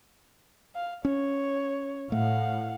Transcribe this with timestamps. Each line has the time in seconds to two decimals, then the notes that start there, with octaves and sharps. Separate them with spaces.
0.75 F5
1.05 C#4 C#5
2.12 A2 A3 F5 F#5